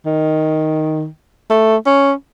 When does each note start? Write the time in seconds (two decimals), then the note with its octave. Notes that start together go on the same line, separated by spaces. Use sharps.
0.06 D#3
1.50 A3
1.87 C#4